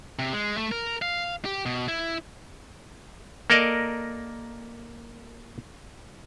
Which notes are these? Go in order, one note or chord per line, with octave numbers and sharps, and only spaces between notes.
C3
G#3
A3
A#4
F5
G4
B2
E4
A#3 A4 A#4 D5 D#5